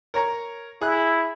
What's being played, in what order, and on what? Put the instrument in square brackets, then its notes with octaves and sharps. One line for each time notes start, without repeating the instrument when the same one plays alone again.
[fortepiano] A#4 C#5 A#5
[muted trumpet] E4 [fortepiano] G#4 F#6